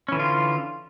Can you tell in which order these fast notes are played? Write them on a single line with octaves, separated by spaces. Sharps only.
C#4 E3 D3 F4